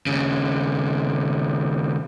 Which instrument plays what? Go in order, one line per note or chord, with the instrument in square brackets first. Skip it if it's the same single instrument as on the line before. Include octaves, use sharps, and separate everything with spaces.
[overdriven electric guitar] D#2 C#3